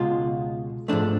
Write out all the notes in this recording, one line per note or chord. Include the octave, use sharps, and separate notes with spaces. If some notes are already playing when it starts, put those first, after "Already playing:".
Already playing: C#2 B2 G#3 F4
G#2 F3 A3 D4